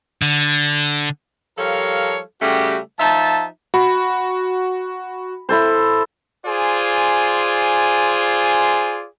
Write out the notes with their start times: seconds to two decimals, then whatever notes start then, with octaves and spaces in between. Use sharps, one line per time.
0.22 D3
1.58 F3 G3 A4 A#4 C#5 F5
2.41 C#3 G3 A3 F#4 G4
2.98 F3 D#4 E5 A5
3.74 F#4 B5
5.49 E4 A4 C5
6.46 F4 G#4 C5 D5 G#5